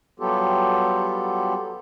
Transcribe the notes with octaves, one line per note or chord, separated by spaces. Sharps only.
F#3 G3 B3 F4 G4 A4